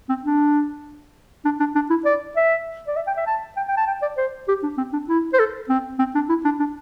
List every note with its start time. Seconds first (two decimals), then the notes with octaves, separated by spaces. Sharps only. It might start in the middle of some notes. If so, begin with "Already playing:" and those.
0.09 C4
0.24 D4
1.45 D4
1.60 D4
1.75 D4
1.90 E4
2.05 D5
2.36 E5
2.88 D5
2.96 E5
3.07 G5
3.17 E5
3.27 A5
3.57 G5
3.68 G5
3.77 A5
3.87 G5
4.02 D5
4.17 C5
4.48 G4
4.63 D4
4.78 C4
4.93 D4
5.09 E4
5.34 C5
5.39 A4
5.69 C4
5.99 C4
6.15 D4
6.29 E4
6.45 D4
6.60 D4